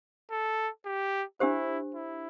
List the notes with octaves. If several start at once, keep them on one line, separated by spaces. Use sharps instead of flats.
A4
G4
D4 E4 G4 C5
E4